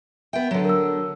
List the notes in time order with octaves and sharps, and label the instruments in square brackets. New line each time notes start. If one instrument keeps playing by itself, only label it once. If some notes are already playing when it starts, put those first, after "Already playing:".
[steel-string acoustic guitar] B3 G5 [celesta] E5
[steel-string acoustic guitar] D3 F#3
[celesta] A#4 E6